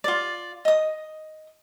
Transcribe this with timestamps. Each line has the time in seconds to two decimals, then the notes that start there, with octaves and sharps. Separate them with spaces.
0.04 F4 D5
0.65 D#5 D#6